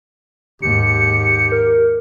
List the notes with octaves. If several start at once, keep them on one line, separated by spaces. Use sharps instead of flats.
D#2 G#2 G4 C#7
A#4